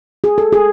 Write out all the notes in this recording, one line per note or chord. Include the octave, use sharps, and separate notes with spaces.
G#4
A4
G#4